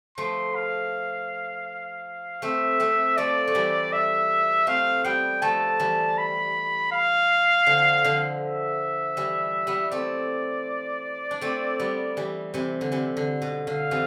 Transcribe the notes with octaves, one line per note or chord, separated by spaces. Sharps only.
F3 A3 C6
F5
A3 C4 E5
A3 C4
F3 A3 D5
A3
E3 G3
E5
A3 C4 F5
G3 B3 G5
F3 A3 A5
E3 G3
B5
F5
D3 F3
D3 F3
E5
E3 G3
G3 B3
A3 C4 D5
D4
A3 C4
G3 B3
E3 G3
C3 E3
D3
C3 E3
D3
B2
D3 F5
C3 E3